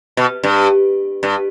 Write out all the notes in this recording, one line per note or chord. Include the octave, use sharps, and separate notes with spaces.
B2
G2
G2